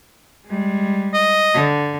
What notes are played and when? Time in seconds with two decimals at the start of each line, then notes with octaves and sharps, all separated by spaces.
0.47 G3 G#3
1.14 D#5
1.54 D3